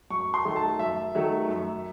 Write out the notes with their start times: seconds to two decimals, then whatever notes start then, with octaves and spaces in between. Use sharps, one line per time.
0.11 F#2 C#6
0.34 C6
0.45 D#3 F#3 A3
0.56 A5
0.79 F#2 E5
1.15 D#3 F#3 A3
1.49 F#2